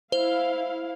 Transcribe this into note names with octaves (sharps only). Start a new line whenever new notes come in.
E4 C5 F5